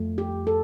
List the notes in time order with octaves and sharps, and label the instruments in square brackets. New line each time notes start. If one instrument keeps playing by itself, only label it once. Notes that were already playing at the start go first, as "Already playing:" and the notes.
Already playing: [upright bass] F2 [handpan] A3
[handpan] G4
A4